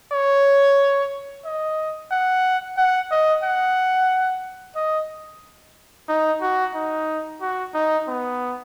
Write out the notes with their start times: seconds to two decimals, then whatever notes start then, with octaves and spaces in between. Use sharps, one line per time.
0.12 C#5
1.45 D#5
2.11 F#5
2.78 F#5
3.11 D#5
3.44 F#5
4.76 D#5
6.09 D#4
6.42 F#4
6.75 D#4
7.41 F#4
7.74 D#4
8.08 B3